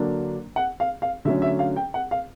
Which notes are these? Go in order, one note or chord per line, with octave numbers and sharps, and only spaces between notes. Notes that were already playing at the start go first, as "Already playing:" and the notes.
Already playing: D3 F#3 A#3 D4
F#5
F5
F5
D3 F#3 A3 C#4 E5
E5
F5
G5
F#5
F5